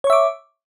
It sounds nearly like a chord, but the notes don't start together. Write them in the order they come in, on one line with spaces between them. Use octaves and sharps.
C#5 C#6 E5 D6